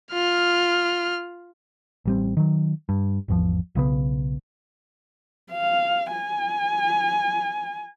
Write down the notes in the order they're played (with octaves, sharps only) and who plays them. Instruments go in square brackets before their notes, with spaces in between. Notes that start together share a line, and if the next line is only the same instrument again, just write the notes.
[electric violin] F4 F6
[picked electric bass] A1 G3 C4
D#3 F#3
G2
G#1 E2 F3
B1 C#3 G3 B3
[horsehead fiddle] F5
G#5